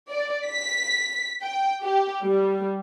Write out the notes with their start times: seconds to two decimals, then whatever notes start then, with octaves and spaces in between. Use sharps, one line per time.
0.11 D5
0.47 B6
1.43 G5
1.83 G4
2.25 G3